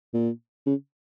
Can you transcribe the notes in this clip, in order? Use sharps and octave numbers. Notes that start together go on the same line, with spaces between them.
A#2
C#3